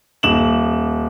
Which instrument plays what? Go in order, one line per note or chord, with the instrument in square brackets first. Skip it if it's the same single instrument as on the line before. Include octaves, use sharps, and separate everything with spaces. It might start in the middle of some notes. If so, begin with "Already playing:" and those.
[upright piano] D#1 E7 F#7